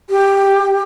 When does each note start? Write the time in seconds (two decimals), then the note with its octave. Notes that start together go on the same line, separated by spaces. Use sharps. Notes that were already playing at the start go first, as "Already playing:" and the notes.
0.10 G4